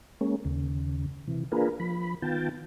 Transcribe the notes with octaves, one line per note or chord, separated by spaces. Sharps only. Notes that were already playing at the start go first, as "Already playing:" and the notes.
G#3 A#3 C#4
D#2 C#3
C3 E3
A#3 D4 F4 G#4 A#4 B4
F3 B5
D#3 B3 F4 G5 A5